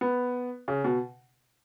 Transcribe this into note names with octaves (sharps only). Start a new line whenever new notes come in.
B3
C#3
B2